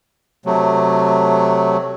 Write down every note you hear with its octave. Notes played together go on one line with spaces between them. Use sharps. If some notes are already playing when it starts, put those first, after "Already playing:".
C3 F#3 A3